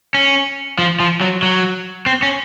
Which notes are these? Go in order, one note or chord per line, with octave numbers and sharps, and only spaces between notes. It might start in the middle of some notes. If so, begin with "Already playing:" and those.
C#4
F3
F3
F#3
F#3
C4
C#4